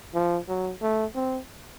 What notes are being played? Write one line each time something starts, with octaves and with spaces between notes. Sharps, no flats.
F3
F#3
A3
C4